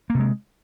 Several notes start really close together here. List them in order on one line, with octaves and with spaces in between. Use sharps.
A#3 C3 G#3